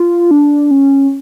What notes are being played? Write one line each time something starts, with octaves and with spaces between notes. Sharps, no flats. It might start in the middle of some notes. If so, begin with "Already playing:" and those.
Already playing: F4
D4
C#4